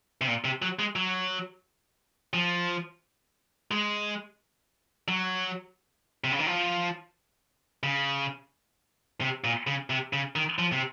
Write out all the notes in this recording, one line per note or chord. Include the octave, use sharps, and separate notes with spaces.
C3
A#2
C3
F#3
G#3
F#3
F3
G#3
F#3
C3
C#3
D#3
F3
C#3
C3
A#2
C#3
C3
C#3
D#3
F3
C3